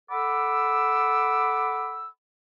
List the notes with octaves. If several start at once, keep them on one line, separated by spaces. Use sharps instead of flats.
A4 F#5 B5 D6 E6